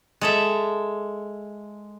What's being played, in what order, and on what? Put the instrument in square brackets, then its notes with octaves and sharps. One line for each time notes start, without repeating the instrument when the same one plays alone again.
[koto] G#3 A4 E5